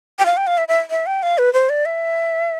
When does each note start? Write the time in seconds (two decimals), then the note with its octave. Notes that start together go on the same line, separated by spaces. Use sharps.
0.19 G5
0.26 F5
0.37 G5
0.47 F5
0.58 E5
0.68 E5
0.91 E5
1.06 G5
1.23 F5
1.38 B4
1.53 C5
1.69 D5
1.85 E5